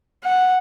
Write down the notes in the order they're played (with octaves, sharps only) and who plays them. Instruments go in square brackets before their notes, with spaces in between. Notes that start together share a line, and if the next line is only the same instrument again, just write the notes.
[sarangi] F#5